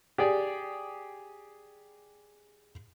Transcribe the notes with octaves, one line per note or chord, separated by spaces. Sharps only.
G4 G#4 D5